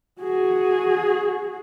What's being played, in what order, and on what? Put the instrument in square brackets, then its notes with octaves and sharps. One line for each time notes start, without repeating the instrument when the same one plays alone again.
[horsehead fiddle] F#4 G#4